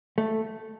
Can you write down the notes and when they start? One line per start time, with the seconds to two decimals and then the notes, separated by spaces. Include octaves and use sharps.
0.18 A3